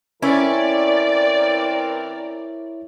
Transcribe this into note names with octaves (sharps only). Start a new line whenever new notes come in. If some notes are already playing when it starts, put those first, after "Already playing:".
E3 C4 C#4 E4 A#4 C#5 D5 E5